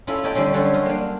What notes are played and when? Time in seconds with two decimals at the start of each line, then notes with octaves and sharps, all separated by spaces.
0.07 C#4 E4 F4 A4 B5
0.24 A4 C#5 D#5 E5 G5 B5
0.35 D3 G3 C4 C#4
0.54 F#3 G3 C#4 A4 C5 C#5
0.73 A#4 C5 D#5
0.86 A#3 D4